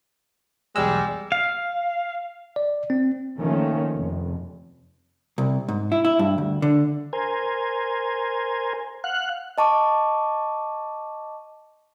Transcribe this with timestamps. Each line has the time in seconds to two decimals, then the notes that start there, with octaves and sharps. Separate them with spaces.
0.76 B1 E2 G3 G#3 E6
1.32 F5
2.56 D5
2.90 C4
3.38 D#3 F3 A3 A#3 C#4
3.96 F1
5.38 C2
5.68 G#2
5.92 E4
6.05 E4
6.19 G2
6.38 D2
6.62 D3
7.13 A#4 C5 G#5
9.04 F5 F#5 F#6
9.58 D#5 A5 C#6 D6